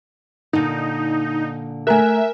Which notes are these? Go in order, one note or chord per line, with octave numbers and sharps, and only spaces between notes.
A#2 D3 D#4
A3 A#4 E5 G#5 A#5 F#6